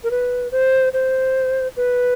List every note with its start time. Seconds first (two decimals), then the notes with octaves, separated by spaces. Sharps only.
0.04 A#4
0.11 B4
0.52 C5
0.93 C5
1.77 B4